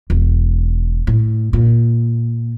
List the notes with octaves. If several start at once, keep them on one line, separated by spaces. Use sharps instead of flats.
E1
A2
A#2